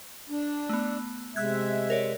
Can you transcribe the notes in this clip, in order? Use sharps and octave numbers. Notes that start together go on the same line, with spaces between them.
D4
A3 B3
C3 G#3 E5 E6 F#6 G#6
A#4 C#5 D5